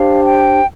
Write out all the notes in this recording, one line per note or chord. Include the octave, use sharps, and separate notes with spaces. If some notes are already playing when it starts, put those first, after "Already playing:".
Already playing: D4 G4 C5 F5
G5